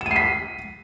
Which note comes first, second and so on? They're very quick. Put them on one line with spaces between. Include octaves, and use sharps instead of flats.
E7 D#7 C7 B6